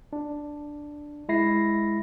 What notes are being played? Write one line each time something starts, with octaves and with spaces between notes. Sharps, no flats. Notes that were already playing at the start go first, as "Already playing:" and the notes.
D4
G#3 E4 A#6 C7